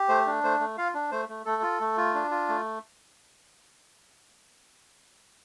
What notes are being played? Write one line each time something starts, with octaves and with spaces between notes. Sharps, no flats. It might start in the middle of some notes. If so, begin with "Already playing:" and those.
Already playing: G4
A3 C5
D4
A3 C5
A3
F4 F5
D4
A3 C5
A3
A3 A4
F4
A3
F4
D4
F4
A3